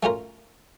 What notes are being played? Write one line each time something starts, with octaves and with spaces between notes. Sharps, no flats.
A3 C#4 F4 A#4